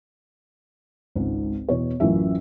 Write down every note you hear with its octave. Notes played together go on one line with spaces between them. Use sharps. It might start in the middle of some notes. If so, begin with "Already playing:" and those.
G#1 C#2 G#2
E2 B2 C#5
A1 F#2 E3 C#4 F4 E5